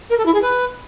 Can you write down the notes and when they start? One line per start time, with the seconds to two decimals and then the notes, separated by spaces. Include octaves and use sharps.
0.10 A#4
0.18 A4
0.26 E4
0.34 G#4
0.42 B4